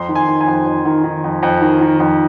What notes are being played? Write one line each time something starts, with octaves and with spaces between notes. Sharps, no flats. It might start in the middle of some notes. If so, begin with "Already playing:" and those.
Already playing: F2 C6
D#3
G#5
D#3
G#5
F2
F2
D#3
D#3
F2
F2
D#3
D#3
F2